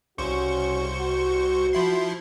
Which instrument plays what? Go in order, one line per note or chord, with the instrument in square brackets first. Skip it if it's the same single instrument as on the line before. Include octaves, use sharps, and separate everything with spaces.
[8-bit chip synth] C2 C5 C#6 [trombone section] C#3 F#4
[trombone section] F#4
[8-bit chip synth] F3 E4 C6